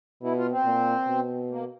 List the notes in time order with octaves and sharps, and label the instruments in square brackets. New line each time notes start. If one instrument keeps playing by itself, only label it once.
[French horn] B2 [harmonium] E4
[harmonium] F4
C4
[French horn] A#2
B2
[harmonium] A#3